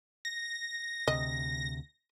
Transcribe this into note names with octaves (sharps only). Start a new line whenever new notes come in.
A#6
D2 C3 D#5